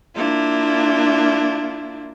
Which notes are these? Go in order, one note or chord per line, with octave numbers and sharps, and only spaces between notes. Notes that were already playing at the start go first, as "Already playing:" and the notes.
A#3 D4 E4 F4